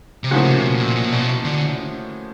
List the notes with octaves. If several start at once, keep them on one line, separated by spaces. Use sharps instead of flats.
C3
A2 C#3 F3 A#3 C#4 F#4
C3
B2
A#2
A#2
B2
D3